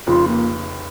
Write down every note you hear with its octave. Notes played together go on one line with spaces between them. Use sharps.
F1 F2 C#3 F4
A#3